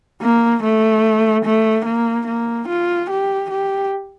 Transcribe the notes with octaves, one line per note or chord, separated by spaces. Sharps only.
A#3
A3
A3
A#3
A#3
F4
G4
G4